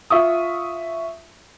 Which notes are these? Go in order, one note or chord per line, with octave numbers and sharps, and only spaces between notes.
F4 E5 C#6 D#6